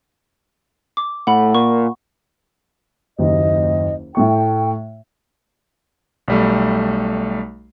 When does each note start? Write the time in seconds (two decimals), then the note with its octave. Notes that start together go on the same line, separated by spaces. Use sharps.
0.97 D6
1.27 A2 F#5 B5
1.55 A#2 C#6
3.19 F#1 D#2 D#5
4.15 A2 A3 G5 C#6
6.28 B1 G3 A3